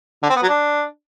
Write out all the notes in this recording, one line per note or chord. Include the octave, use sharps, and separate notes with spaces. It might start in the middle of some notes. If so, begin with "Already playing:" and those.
D3
C4
B3
F#3
D4